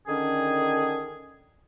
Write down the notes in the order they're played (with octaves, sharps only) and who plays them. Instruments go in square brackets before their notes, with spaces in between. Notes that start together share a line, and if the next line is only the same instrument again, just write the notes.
[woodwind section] D3 D#3 C#4 G#4